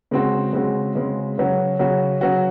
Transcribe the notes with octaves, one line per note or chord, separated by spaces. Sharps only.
C#3 G#3 C4 F#4
C#3 G#3 C4 F#4
C#3 G#3 C4 F#4
C#3 F#3 C#4 F#4
C#3 F#3 C#4 F#4
C#3 F#3 C#4 F#4